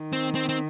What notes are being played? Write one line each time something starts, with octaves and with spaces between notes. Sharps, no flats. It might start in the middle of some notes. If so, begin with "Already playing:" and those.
Already playing: D#3
C4
C4
C4